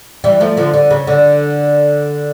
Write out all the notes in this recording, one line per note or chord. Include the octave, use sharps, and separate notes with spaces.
E3 G3
F3 A3
D3 F3
D3
C#3
D3